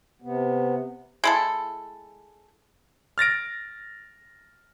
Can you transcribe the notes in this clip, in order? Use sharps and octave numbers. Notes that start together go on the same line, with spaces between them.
C3 B3
G#3 E4 A4
F6 A6 A#6 D7